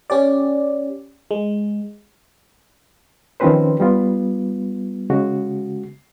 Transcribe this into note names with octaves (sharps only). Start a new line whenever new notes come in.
C#4 G4 D5
G#3
D#3 F3 C4 C#4 B4 C5
G3 B3 F4
C#3 G#3 F#4